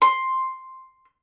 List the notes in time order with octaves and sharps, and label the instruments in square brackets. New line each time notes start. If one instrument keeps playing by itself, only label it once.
[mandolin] C6